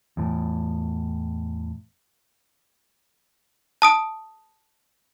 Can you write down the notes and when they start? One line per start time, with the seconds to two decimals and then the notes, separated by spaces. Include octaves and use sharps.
0.17 E2 A2
3.82 A5 D#6 D7